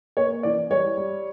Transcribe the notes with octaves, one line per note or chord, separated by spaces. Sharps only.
A#3 C#5
E3 D5
G3 C#5
G3